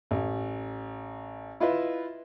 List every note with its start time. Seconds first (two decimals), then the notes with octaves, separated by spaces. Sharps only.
0.11 A1
1.60 E4 F4 B4 D#5 E5